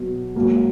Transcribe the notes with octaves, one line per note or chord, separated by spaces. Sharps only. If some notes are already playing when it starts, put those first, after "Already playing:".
Already playing: B2 F#3 B3
G#2 F#3 A#3